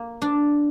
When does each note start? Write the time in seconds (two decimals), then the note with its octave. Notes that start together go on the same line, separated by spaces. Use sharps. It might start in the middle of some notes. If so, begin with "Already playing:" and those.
Already playing: A#3
0.22 D4